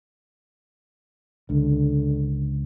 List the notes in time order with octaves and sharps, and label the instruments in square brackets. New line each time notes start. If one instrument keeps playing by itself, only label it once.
[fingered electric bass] C#2 [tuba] D3